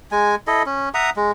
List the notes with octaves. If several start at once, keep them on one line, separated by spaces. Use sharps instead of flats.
G#3 G#5
E4 A4 D#5
C#4
E5 F#5 A#5 D#6
G#3